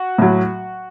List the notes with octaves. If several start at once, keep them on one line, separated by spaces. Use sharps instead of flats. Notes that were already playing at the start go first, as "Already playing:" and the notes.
Already playing: F#4
A2 F#3